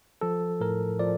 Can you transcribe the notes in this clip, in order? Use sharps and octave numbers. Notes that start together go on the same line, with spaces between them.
F3 A4
A2 A#4
F3 D5